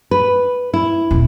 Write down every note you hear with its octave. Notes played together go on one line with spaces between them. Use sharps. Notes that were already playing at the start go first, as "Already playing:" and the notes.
B4
E4
D#1